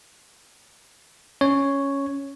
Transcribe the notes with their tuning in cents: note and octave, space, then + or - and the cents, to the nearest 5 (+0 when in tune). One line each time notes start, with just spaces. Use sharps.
C#4 +0 C#5 +0